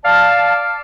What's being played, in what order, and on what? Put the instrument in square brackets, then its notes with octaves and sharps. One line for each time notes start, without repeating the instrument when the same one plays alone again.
[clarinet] D5 [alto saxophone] F5 [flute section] A5